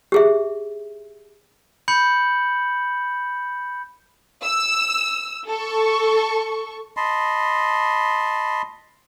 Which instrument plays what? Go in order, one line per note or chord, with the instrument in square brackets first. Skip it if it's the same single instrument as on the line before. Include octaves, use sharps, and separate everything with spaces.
[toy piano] G4 G#4 E5
[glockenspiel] B5 G6 C#7 F#7
[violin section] E6
A4 C#6
[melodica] D#5 A5 B5 C6